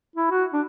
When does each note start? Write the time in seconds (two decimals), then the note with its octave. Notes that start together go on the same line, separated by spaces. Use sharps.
0.16 E4
0.31 F#4
0.53 D4